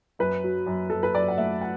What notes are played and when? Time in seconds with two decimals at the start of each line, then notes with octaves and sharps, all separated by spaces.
0.19 F#2 B4
0.44 F#3
0.66 F#2
0.90 F#2 A4
1.03 B4
1.14 F#2 D5
1.28 F#5
1.38 A3 E5
1.61 F#5